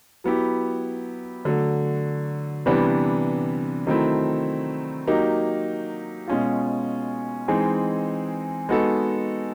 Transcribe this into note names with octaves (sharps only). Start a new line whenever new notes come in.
F#3 B3 E4 G4
D3 F#3 A3
C3 E3 G3 B3 D4
D#3 F#3 A3 C4 E4
F#3 A#3 D#4 G4
B2 G#3 C#4 F4
E3 G#3 C4 D#4 G#4
G#3 B3 D#4 F#4 A4